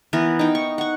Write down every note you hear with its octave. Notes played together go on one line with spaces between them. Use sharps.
E3 B3 A#4
D#4 G5
C#6
F#5 C#6